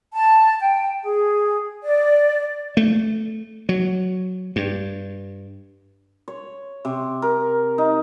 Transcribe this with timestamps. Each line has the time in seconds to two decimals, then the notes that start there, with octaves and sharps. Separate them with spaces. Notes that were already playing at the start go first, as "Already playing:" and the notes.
0.14 A5
0.60 G5
1.03 G#4
1.84 D5
2.77 A3
3.69 F#3
4.56 G2
6.28 C#5
6.85 C3
7.22 A#4
7.78 D#4